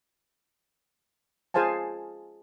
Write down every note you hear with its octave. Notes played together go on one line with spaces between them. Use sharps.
F4 G#4 C5 F5 G#5 A5